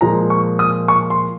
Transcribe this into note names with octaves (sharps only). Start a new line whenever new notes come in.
A#2 F3 G#3 A#5
C#6
D#6
C#6
C6